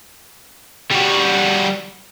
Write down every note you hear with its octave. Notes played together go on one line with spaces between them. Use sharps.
G3 F#4